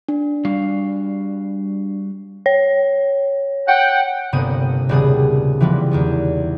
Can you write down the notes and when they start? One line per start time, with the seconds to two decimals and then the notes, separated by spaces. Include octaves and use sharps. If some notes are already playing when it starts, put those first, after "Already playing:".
0.08 D4
0.45 G3 F#4 F5
2.46 C#5
3.68 F#5 G5
4.33 G1 C3 A#3 B3 D#6 D#7
4.89 D#1 C#3 G3 B3 G#4 D#6
5.60 E3 F3 G3 G#3 B3
5.91 E2 D#3 B3